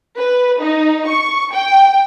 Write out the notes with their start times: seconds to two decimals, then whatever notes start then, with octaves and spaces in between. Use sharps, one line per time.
0.18 B4
0.60 D#4
1.06 C#6
1.53 G5